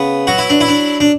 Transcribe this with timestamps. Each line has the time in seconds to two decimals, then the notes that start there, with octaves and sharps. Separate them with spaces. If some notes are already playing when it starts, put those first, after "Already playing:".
Already playing: C#3 B3
0.27 F#3 F#4
0.38 E4
0.50 D4
0.60 E4
0.68 D4
1.00 D4